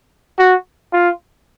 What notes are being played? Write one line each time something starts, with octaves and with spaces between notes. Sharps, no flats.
F#4
F4